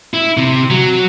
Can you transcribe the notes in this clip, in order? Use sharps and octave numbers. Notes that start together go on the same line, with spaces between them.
E4
C3
F#3